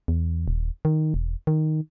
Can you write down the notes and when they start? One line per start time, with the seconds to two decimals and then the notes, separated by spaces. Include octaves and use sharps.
0.08 E2
0.48 D#1
0.85 D#3
1.14 E1
1.47 D#3